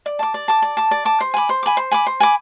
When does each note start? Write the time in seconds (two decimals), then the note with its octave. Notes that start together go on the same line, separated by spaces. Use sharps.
0.06 D5
0.19 A5 D6
0.34 D5
0.48 A5 D6
0.62 D5
0.77 A5 D6
0.91 D5
1.05 A5 D6
1.21 C5
1.34 G#5 B5 D6
1.49 C5
1.63 G#5 B5 D6
1.77 C5
1.91 G#5 B5 D6
2.07 C5
2.20 G#5 B5 D6